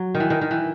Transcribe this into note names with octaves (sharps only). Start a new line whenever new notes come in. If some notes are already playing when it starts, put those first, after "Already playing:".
Already playing: F#3
D#3
E3
D#3
D#3
E3